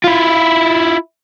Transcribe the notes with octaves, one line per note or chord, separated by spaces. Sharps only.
E4 F4